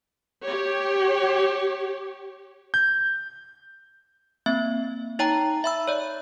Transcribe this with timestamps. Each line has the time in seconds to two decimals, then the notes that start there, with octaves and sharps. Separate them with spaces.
0.44 G4 C#5
2.74 G6
4.46 A#3 C4 E5
5.19 D#4 C#5 G5 A5 A#5
5.64 E5 B5 E6
5.88 C#5 D5